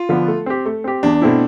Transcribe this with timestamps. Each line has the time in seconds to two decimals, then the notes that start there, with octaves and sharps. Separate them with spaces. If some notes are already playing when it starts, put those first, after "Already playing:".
Already playing: F4
0.09 D3 F3 B3
0.28 A3
0.46 C4 G4
0.65 A3
0.84 C4 G4
1.03 E2 D4
1.22 B2 A3 C4 E4